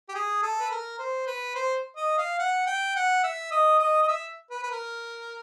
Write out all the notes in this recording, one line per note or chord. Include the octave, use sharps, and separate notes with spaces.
G4
G#4
A4
B4
A#4
C5
B4
C5
D#5
F5
F#5
G5
F#5
E5
D#5
D#5
D#5
E5
B4
B4
A#4